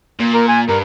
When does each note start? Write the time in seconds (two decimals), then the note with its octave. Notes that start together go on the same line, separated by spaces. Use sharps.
0.20 A#2
0.34 A#4
0.48 G#5
0.69 G2 A#4